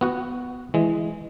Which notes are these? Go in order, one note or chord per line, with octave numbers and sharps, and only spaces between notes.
B3 F#4 F#5
E3 G#3